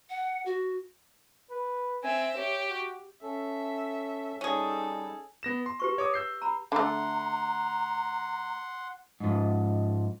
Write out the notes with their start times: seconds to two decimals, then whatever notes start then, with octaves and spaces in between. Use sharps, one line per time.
0.10 F#5
0.46 F#4
1.50 B4
2.04 C4 E5 G#5
2.37 G4 C#5
2.69 F#4
3.23 C#4 A4 E5
4.41 G3 C#4 D#4 G#4 A4
5.43 B3 A#6 E7
5.66 C6
5.80 G4 B4 C#6
5.98 C#5 D6 D#6
6.14 E6 G6 C7
6.42 A#5 B5
6.72 D3 A3 F#5 A#5 C6
9.20 G#2 F3